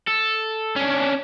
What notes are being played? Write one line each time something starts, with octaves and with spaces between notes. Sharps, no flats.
A4
C#4 D4